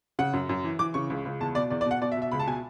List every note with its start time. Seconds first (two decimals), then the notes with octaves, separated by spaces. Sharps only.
0.19 C#3 F#5
0.33 F#2
0.49 F#2
0.64 E3
0.79 E3 D6
0.94 C#3 C#6
1.10 C#2
1.25 C#2
1.40 E2 A5
1.55 B2 D5
1.70 E2 D5
1.81 D5
1.86 B2 F#5
2.02 B2 D5
2.12 E5
2.17 B2
2.22 E5
2.32 C#2 B5
2.40 A5
2.47 B2 G#5